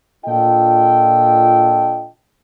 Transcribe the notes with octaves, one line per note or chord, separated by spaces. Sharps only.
A#2 D4 F4 A4 D#5 G5